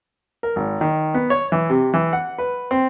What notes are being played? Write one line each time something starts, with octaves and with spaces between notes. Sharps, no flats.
A#4
G#1
D#3
B3
C#5
E3
C3
E3
F#5
B4
C4